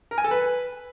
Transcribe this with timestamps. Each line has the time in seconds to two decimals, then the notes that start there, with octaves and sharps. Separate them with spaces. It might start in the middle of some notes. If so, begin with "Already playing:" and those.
0.11 A#4
0.18 G#5
0.24 A4
0.31 B4